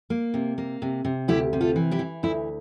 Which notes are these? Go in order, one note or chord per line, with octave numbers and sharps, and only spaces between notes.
A#3
C3
A#3
C3
C3
D2 E4 G4
C3
F4 A4
E3
E4 G4
E3
D2 E4